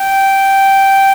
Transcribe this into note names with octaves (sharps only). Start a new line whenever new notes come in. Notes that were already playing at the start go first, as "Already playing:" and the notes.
Already playing: G5